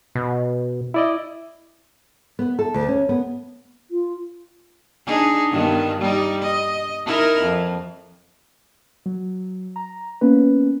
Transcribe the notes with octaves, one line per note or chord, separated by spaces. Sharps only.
B2
E4 D5 D#5
B3
A4
D2
C#4
B3
F4
D4 D#4 G#4
G2 D#3 B3
G3 D#4
D#5
D#4 E4 A#4
F2
F#3
A#5
A#3 B3 C#4 B4